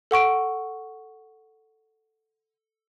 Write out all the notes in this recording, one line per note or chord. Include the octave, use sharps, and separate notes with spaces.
A4 F#5 C#6 D7